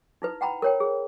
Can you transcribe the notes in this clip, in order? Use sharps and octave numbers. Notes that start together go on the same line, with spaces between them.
D#4 E4 B4
F#5 G5 A#5 B5
A#4 C#5 G5
G#4